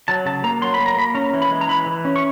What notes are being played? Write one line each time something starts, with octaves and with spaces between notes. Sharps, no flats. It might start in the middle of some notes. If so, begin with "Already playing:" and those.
F#3 A5
C#3 A5
A#3 A#5
F#3 C6
B5
A#3
A#5
A#3 B5
C#4 A#5
E3
B5
G#3
A#5
E3 B5
E3
C#4
C#6